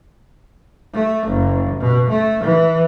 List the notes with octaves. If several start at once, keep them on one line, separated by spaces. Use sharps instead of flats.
A3
F#1
B2
A3
E3